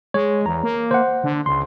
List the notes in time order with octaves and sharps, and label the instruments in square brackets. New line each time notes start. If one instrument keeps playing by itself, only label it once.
[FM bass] G#3 [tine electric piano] C#5
[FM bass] E2 [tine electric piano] A#5
[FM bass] A#3
[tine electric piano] C5 F#5
[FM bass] D3
[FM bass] C#2 [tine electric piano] C6